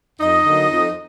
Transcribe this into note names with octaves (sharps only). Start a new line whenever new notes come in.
F2 D#4 D#5
D3 F#3 A#3
F2